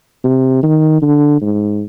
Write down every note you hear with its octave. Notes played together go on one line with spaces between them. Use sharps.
C3
D#3
D3
G#2